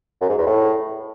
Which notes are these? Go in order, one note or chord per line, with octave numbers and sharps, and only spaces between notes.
F#2
G#2
E2
A2